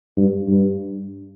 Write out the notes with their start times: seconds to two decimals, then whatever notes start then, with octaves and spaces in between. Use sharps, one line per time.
0.17 G2
0.48 G2